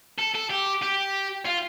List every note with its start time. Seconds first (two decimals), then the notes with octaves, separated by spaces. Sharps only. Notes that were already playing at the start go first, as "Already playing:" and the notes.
0.19 A4
0.35 A4
0.50 G4
0.82 G4
1.45 F4